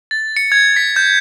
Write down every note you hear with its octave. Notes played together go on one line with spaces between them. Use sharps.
A6
C#7
G#6
B6
G6